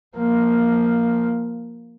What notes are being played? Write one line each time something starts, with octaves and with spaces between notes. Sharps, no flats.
F3 A#3